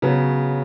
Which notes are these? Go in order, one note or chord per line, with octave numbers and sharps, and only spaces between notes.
C#3 F#3 B3